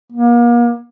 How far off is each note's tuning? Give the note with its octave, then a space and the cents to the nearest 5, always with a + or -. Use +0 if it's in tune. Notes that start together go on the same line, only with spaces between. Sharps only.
A#3 +40